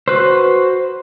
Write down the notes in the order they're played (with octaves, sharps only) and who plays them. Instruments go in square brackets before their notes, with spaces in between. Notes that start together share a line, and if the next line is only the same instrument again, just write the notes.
[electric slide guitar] F#4 B4 C5